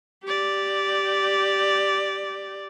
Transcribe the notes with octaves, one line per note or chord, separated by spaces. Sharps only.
G4 D5